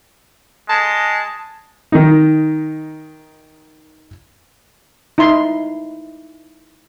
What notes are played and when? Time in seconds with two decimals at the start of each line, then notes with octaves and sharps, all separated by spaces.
0.69 G#3 A5
1.92 D#3 D#4
5.18 D#4 E4 D#5 C6